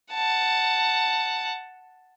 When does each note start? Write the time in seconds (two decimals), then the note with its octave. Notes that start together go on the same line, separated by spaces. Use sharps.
0.13 F#5 A5